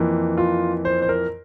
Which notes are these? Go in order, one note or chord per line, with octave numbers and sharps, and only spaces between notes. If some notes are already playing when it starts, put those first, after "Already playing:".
Already playing: F2 E3 A#3
F4
C5
C5
A#4